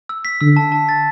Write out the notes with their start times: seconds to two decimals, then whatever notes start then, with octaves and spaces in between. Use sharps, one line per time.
0.09 E6
0.25 B6
0.41 D3 E6
0.56 A5
0.72 A5
0.89 A6